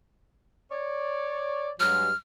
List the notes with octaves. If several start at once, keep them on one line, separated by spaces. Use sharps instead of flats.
C#5 D5
G2 F#3 G#3 F6